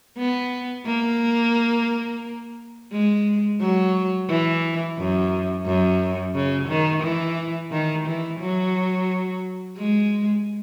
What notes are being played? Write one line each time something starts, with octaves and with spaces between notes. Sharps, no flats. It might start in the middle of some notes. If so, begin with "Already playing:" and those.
B3
A#3
G#3
F#3
E3
F#2
F#2
C#3
D#3
E3
D#3
E3
F#3
G#3